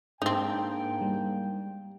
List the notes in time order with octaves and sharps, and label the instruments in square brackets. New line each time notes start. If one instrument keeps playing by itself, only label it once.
[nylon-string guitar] G#2 D4 [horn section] A#3 G5 [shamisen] C4 D#4
[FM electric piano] G3